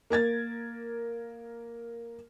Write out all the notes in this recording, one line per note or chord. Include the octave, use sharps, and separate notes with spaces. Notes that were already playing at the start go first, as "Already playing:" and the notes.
A#3 A#4 G#6 A6